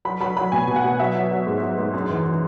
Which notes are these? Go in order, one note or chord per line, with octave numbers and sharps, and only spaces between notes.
F#3 B5
F#3 B5
F#3 B5
B2 G#5
B2
F#5
B2
F#3 E5
F#3
F#3
G#2
F#3
G#2
F#2
E3
E3